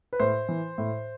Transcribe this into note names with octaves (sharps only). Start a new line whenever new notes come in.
B4
A2 C5
E3
A2